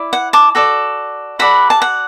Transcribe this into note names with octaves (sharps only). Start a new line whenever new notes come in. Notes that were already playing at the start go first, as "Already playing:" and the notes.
Already playing: E4 D5
F#5
A5 D6
F#4 A4 D5
F#4 A4 D5 F#5 B5
A5
F#5